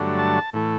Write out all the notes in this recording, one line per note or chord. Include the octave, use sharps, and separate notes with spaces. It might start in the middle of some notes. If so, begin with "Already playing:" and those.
Already playing: G2 D3 F#3 A3
A5
A2 E3 A3